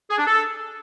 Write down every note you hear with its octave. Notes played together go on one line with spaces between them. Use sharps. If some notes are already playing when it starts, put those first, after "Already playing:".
G#4
D4
A4